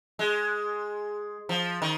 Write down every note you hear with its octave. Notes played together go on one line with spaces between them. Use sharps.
G#3
F3
D#3